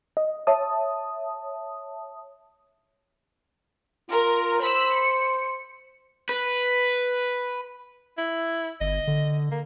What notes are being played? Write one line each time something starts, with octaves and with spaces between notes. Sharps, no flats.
D#5
C#5 E5 A5 D#6
F4 A#4
C5 B5 E6
C#7
B4
E4
G1 D#5
D3
A#3